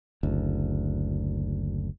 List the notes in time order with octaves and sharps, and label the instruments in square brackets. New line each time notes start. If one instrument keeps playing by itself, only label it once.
[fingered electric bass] F#1 D2